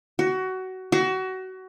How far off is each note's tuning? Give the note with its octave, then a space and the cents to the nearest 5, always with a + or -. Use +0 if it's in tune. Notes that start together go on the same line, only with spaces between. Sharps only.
F#4 +20
F#4 +25